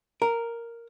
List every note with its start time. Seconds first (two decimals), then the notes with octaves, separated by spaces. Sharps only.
0.22 A#4